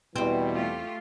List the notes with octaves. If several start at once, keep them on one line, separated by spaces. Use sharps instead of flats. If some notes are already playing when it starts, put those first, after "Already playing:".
E2 B2 E3 G3 C4
A3 F4 G4